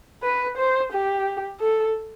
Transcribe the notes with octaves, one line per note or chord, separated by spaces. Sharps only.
B4
C5
G4
A4